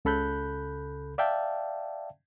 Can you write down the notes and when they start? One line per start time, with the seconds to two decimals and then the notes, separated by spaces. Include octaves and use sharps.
0.05 C#2 C#3 A4 B5 F#6 G6
1.18 D5 E5 F5 G5 A5